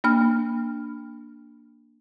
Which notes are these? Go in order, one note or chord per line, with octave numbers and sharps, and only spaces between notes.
A#3 D4 F6